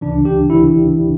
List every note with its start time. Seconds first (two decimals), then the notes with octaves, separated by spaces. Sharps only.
0.01 C#2 C#3 E3 D4
0.25 G4
0.50 C#3 E3 E4